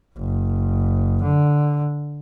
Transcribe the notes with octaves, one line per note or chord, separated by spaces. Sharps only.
F#1
D3